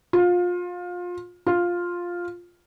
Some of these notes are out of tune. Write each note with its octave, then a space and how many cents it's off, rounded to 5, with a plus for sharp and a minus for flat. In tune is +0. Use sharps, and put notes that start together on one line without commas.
F4 +25
F4 +5